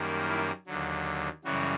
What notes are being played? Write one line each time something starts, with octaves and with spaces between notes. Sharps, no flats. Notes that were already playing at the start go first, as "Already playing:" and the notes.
Already playing: F#2 D#3 G3 A#3
E4
D#2 D3 F#3
F#2 C#3 E3 G3 F#4